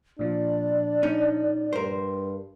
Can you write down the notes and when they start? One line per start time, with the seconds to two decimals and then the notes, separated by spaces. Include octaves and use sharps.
0.19 A#2 F3 D4 D5
1.03 C#4 D#4
1.73 G2 A#4 C5